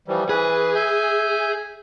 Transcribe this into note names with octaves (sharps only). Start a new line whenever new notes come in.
E3 F3 G3
E3 G#4 B4
E5 G#5 G6